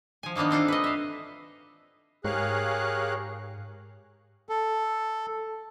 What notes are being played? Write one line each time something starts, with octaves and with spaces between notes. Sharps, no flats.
F3 G#5
D#3 A#3 B3 D4 D#4
C4 D4 F4 A4
B4 D#5
E5 F5
G#2 G4 G#4 A#4 C#5 F5 F#6
A4